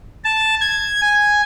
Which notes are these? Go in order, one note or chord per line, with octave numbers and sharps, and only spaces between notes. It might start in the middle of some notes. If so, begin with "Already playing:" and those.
A5
G#6
G#5